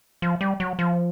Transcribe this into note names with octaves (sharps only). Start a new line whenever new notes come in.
F3
G3
F#3
F3